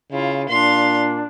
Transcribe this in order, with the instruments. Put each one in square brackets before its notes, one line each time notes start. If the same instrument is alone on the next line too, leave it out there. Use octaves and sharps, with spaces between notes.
[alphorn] C#3 [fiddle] E4 F4
[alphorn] A#2 [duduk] D4 [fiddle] F5 C6